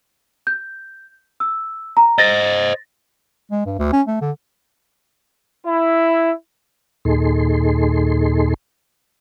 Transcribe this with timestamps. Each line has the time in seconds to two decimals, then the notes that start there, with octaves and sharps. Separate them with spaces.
0.47 G6
1.40 E6
1.97 A#5
2.18 C5 D#5 A6 A#6
3.51 G#3
3.66 G2
3.79 D2
3.92 C#4
4.07 A3
4.21 D3
5.66 E4
7.05 D#2 A#2 D#4 G#4 A4 C6